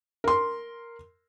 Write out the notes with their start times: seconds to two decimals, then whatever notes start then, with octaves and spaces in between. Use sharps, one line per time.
0.24 A#4 C6